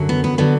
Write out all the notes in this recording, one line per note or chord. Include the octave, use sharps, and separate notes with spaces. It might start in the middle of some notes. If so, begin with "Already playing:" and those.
Already playing: F#2 D3 F#3
B3
B3
D3 F#3 B3